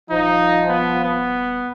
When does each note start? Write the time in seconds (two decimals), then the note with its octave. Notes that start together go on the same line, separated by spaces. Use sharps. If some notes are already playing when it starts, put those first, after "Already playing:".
0.10 D#1 F3 D#4
0.69 B3
1.04 B3